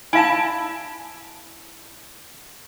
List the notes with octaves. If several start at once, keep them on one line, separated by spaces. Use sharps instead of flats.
E4 F5 G#5 A5